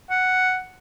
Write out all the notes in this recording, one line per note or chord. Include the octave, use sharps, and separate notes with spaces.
F#5